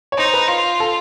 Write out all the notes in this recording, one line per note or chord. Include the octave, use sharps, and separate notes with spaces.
C#5
D#4 C5
B4
F4
A4